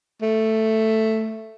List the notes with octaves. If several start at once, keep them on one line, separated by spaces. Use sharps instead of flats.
A3